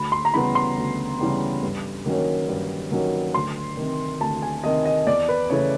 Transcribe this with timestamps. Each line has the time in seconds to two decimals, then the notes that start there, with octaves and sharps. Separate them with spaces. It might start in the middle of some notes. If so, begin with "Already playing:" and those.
Already playing: D2 B5
0.12 C6
0.25 A#5
0.34 C#3 E3 G3 B3 B5
0.55 C6
0.77 D2
1.20 C#3 E3 G3 B3
1.63 G2
2.06 D#3 F#3 A#3 C#4
2.49 G2
2.92 D#3 F#3 A#3 C#4
3.34 D2 C6
3.77 C3 D#3
4.21 D2 A5
4.42 G#5
4.64 C3 D#3 D#5
4.85 D#5
5.07 E2 D5
5.29 B4
5.50 C#3 E3 A3 C#5